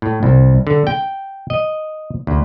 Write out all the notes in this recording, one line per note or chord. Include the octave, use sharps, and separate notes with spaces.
A2
C2
D3
G5
D#5
D2